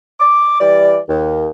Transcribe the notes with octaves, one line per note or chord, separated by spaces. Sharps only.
D6
E3 G3 D5
D#2